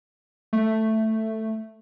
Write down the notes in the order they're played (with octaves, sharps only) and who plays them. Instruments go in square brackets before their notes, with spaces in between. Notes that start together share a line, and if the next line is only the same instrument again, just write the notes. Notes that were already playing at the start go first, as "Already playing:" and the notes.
[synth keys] A3